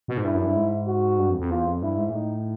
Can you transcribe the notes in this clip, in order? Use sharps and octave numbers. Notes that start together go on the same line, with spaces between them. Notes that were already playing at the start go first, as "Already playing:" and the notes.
B2
G#2
G2 E4
F#2
G2
G#2
F#4
G2
F2
F2
E2 F4
F2
G2 E4
G#2
A#2
A2 D#4